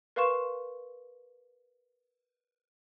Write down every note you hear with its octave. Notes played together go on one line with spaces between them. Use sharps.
A#4 B4 F5 C6 C#6 E7